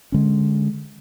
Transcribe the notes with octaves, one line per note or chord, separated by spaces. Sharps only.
D3 G#3 C#4